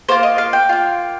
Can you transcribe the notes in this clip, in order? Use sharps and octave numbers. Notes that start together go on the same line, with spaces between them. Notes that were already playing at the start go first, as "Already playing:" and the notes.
A#3 F4 C5
D#5
F5
G5
A#3 F4